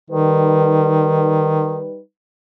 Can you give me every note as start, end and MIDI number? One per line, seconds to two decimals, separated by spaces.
0.10 1.87 51
0.10 1.99 55
0.10 1.99 63
0.10 1.99 71